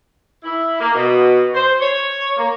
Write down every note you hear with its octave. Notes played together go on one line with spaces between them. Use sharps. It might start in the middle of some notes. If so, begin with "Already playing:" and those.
E4
A#3
B2
C5
C#5
A#3